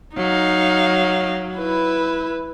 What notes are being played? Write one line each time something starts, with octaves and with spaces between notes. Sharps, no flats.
F#3 D#4 F5
E4 B4